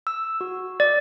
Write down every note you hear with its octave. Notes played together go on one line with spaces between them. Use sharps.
E6
F#4
D5